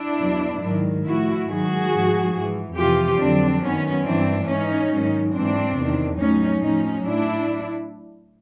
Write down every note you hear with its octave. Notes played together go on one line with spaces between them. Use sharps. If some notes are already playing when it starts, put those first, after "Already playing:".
Already playing: D4 E4
E2 B2 F#3
G#2 D#3 F#3
A2 F3 E4 F#4
G#2 D#3 F#3 F#4 G#4
G#2 F3
G#2 E3
F2 C3 E3 F4 G4
F2 D3 F#3 C4 D4
F#2 D#3 F#3 B3 C#4
G2 E3 C4 D4
G#2 E3 C#4 D#4
G#2 D#3 F#3
G#2 E3 C4 D4
E2 C3 D#3
A2 F#3 C#4 D#4
A2 F3 C#4 D#4
A2 F#3 D4 E4